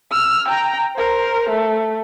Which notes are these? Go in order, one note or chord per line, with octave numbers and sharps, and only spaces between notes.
E6 F6
G5 A#5
A#4 C5
A3